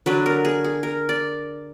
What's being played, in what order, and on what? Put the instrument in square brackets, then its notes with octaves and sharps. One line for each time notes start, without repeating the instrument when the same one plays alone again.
[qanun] D3 F#3 D4 B4
A#4
G#4
G#4
A#4
D5